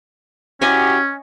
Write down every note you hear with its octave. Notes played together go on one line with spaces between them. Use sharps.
C#4 E4 F#4 G4 C#5 D#5 G#5